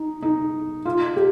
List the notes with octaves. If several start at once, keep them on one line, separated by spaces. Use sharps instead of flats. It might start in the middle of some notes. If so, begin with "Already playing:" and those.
Already playing: D#4
D#4
F4
G4